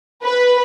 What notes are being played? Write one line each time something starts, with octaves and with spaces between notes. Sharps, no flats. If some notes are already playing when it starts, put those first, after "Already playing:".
B4